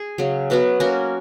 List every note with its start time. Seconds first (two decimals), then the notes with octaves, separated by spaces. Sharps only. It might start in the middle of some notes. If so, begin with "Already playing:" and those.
Already playing: G#4
0.18 C#3 F#3 C#4
0.50 F#3 B3 F#4 B4
0.80 A#3 C#4 F#4 A#4